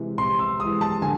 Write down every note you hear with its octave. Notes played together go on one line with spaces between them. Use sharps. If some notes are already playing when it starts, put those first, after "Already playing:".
Already playing: C3 E3 G#3
C3 C6
E6
E3 G#3 D#6
A5
D3 G#5